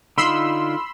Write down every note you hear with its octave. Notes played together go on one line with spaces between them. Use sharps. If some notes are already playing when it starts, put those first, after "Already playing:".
D3 D#4 F4 B5 C6 E6